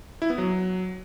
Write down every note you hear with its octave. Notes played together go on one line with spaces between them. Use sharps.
E4
B3
F#3